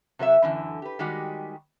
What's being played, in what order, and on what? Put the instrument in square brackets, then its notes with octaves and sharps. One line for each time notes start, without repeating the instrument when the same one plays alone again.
[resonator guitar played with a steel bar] C3 F#3 B4 E5
F#2 D3 E3
G4 B4
D#3 G3 G#3 F#4 G4